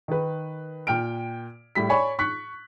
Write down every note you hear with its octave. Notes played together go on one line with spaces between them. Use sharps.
D#3 B4
A#2 G5 F6 D7
A2 G3 B6
C#5 D5 G#5 B5 C#6
C#6 F#6 B6